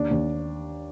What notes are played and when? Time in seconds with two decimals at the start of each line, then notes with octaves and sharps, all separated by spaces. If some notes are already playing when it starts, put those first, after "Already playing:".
Already playing: D#2 D4
0.11 D#2